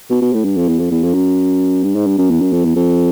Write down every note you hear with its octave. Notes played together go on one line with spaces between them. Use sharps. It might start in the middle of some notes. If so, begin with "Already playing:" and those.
B2
B2
A2
G2
F2
E2
F2
E2
F2
F#2
G2
G#2
G2
F#2
E2
F#2
F2
E2
F2